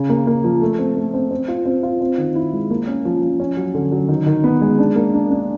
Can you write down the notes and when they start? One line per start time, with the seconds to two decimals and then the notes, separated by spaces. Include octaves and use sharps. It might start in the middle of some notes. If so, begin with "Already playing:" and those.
Already playing: C#3
0.10 A#3
0.27 A#3
0.44 F3
0.61 A3
0.79 C4
0.96 A3
1.14 C4
1.31 C4
1.48 F4
1.65 C4
1.83 F4
2.01 C4
2.18 D#3
2.35 E4
2.53 G#3
2.70 A#3
2.87 C#4
3.05 F3
3.22 F3
3.40 C#4
3.57 F#3
3.74 D3
3.92 F#3
4.09 D#3
4.26 D#3
4.44 B3
4.61 G#3
4.78 D4
4.96 A#3
5.14 D4
5.31 D4